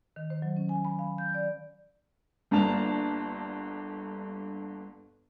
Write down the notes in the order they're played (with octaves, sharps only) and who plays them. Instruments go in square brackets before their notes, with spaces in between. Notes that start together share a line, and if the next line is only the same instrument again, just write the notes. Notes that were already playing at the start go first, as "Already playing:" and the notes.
[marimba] D#3
C5
F#3
C#4
G#5
B5
F5
G6
D5
[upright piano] G1 G2 D3 A#3 A5 F7